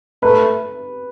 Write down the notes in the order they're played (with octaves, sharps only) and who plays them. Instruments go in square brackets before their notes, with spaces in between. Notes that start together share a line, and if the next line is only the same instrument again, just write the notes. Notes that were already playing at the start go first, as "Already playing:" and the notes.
[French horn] A3 [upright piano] B4